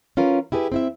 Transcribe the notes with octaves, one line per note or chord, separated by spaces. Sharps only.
C#4 F4 A#4 B4
E4 G4 G#4 A#4 B4
C4 E4 E5